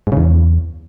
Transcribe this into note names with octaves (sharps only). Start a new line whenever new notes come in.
G#2
C#3
E2